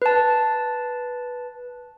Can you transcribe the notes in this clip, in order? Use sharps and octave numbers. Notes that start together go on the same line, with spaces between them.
B4 A5